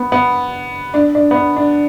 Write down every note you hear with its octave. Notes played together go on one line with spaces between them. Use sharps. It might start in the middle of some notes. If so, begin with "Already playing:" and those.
Already playing: B3
B3
D4
D4
B3
D4
D4